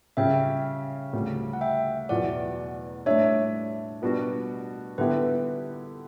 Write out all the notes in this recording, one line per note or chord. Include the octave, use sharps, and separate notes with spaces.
C#3 G3 C#4 E5 G5
D2 C#3 G3
F#5
E5 G5
E2 B2 F#3 D5 F#5
A2 G3 D4 C#5 E5
B2 G3 B3 D4 F#4
D3 G3 B3 E4 G4 B4